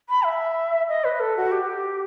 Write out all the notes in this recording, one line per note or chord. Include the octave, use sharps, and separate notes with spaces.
B5
E5
D#5
B4
A4
F#4
G4